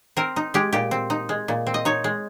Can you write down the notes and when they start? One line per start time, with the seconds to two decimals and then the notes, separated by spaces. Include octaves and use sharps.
0.17 C4 A#4
0.36 D#4
0.54 G#3 G4
0.73 A#2 G4
0.91 C4
1.10 D#4
1.29 G#3
1.48 A#2
1.67 C4
1.74 D#5
1.85 D#4 C#5
2.04 G#3